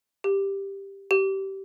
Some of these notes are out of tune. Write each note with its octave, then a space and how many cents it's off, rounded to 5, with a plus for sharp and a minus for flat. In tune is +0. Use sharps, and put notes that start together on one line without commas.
G4 +5
G4 -20